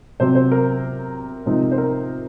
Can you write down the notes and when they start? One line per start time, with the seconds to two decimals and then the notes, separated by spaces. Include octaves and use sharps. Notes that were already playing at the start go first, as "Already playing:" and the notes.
0.20 C3 F#3 C4 C5
0.35 C5
0.51 A#4
1.46 C3 F3 G#3 C4 D#4
1.71 C5
1.78 A#4